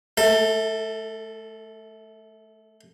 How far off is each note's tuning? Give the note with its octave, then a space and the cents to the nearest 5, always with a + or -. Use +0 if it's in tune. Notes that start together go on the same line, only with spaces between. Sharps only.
A3 -25 A4 +25